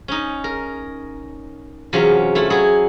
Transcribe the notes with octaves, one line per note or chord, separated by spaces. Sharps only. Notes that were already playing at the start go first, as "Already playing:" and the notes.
C#4 D#4
A#4
E2 C3 F#3 C#4 F4
A3 E4 F4
F#3 E4 G#4